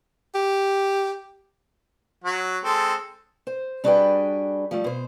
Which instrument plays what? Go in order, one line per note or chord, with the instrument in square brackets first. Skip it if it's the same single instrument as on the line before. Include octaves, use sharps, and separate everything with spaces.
[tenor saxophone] G4
[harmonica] F#3 F#4
G#3 C4 A4
[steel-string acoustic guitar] C5
G3 D4 F#4 G#4 B4 G5
F3 G3 A3
B2 C5